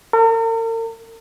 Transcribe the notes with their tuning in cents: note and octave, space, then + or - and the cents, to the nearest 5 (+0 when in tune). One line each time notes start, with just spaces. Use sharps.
A#4 -45